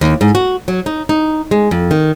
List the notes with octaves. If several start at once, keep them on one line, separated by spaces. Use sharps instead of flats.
D#2
G#2
F#4
F#3
D#4
D#4
G#3
F2
D#3